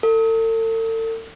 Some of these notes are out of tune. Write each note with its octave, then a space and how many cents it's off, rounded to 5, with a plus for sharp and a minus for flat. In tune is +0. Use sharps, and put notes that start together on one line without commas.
A4 +40